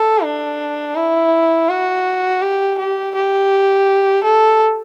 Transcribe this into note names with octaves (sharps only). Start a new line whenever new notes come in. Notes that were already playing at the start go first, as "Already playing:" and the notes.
Already playing: A4
D4
E4
F#4
G4
G4
G4
A4